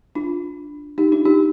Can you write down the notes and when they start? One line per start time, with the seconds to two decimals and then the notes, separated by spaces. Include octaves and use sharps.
0.15 D4 F4
0.98 D#4 G4
1.12 D4 F4
1.25 D#4 G4